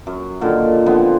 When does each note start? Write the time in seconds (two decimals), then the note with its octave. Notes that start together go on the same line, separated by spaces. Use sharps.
0.07 F#2
0.41 A#2 D3 D#3
0.86 D3 F3 B3 C4